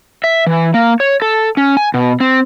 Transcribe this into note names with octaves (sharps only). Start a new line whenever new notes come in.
E5
E3
A#3
C#5
A4
C#4
G#5
B2
C4